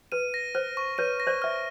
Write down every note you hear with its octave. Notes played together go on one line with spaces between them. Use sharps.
B4 D#7
A#6
C5 F6
C#6
B4 C#5 D#7
A#6
C5 D5
E5 F6